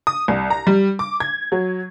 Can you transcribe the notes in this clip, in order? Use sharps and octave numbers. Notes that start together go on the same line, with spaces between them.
D#6
C2
A#5
G3
D6
G#6
F#3